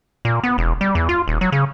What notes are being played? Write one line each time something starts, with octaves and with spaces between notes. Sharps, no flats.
A#2
B3
E1
G3
E2
F4
D#1
F#3
C#3